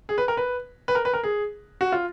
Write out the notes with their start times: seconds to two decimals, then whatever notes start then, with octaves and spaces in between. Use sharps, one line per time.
0.09 G#4
0.18 B4
0.28 A#4
0.37 B4
0.88 B4
0.95 A#4
1.05 B4
1.13 A#4
1.24 G#4
1.81 F#4
1.92 F4